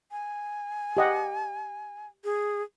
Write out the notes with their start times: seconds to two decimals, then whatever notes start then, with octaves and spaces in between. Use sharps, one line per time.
0.11 G#5
0.97 G4 D#5 F#5
2.24 G#4